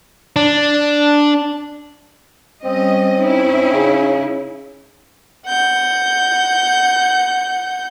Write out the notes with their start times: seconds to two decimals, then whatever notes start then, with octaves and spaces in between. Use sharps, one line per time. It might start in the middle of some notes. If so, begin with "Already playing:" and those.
0.36 D4
2.64 G3 C4 C#4 D#5
3.21 C#4 D#4 E4
3.74 C#3
5.47 F#5 G6